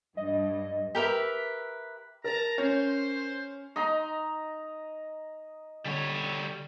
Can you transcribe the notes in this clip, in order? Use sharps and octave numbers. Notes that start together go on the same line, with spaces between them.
G2 D#5
G4 A#4 B4 E5
A#4 A5 A#5
C#4 C5
D#4 D#5 A#5 C6
D3 G3 C#5